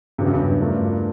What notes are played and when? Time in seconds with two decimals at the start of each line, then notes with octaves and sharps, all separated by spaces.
0.18 E2 G2 C#3 F#3 B3
0.26 F#2
0.33 G2
0.60 A3 D4 F4 A#4